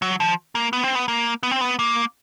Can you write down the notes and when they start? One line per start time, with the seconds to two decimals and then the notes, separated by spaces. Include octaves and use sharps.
0.02 F#3
0.20 F3
0.55 A#3
0.73 B3
0.84 C4
0.95 B3
1.08 A#3
1.43 B3
1.51 C4
1.61 B3
1.79 A#3